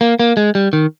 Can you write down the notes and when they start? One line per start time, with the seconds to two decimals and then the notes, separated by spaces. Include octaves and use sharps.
0.01 A#3
0.19 A#3
0.37 G#3
0.55 G3
0.73 D#3